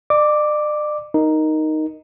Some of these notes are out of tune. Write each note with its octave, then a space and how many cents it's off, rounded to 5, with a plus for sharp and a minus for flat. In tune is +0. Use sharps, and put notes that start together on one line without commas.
D5 +40 D6 +0
D#4 +0 A#4 +0